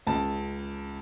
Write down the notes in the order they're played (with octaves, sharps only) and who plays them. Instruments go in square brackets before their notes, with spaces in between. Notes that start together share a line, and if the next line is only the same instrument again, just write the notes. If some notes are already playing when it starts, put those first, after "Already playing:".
[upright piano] C#2 A5